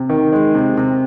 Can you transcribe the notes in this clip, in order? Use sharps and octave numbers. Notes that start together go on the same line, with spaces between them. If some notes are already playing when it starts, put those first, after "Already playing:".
Already playing: C3
D#3
G#3
C3
C3